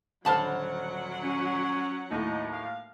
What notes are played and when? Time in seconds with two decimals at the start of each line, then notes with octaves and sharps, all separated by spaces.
0.25 D#1 D3 F#3 C5 F#5 A5 B5 F6
1.23 C#4
2.11 D#2 A2 D#4
2.52 F5